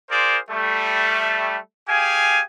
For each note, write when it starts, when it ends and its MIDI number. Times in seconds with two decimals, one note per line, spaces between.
0.11 0.38 65
0.11 0.38 68
0.11 0.38 70
0.11 0.38 72
0.11 0.38 74
0.50 1.57 55
0.50 1.57 57
1.89 2.41 67
1.89 2.41 68
1.89 2.41 77
1.89 2.41 80